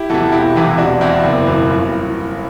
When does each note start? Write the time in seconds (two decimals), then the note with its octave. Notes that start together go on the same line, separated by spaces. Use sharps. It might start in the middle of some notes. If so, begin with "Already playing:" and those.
Already playing: E4 G4
0.10 E2 C3 E3 F#4 A4
0.32 E1 E4 G4
0.55 E2 C3 E3 E4 G4
0.78 E1 D4 F#4
1.01 E2 B2 C4 E4
1.24 F#1
1.47 E2 B2
1.70 G1